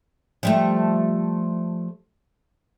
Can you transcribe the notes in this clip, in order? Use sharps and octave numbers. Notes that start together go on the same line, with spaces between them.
F3 G3 A3